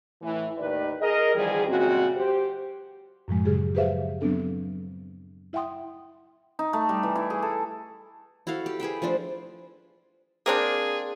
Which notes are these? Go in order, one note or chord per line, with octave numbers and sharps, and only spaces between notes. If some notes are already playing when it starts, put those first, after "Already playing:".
A2 E3
D#2 A2 D#3 B4 D5
G#4 A#4 D#5
E2 D#3 F3 G3 G#4
F#2 A#2 C#3 G#3 C4 F#4
G4 C5
F#2 A2 F3 G#3
C#3 F#3 G4 G#4
G4 G#4 B4 C5 E5 F5
F#3 B3 C4 D4 A4
E4 E5 F#5 G5 C6 D#6
D#4
A3
G3
E3
E4
G#4
A4
E4 F#4 A4 F5
G4
G#4 B4 E5 G5
F3 A3 D4 C5
A#3 C4 D4 G#4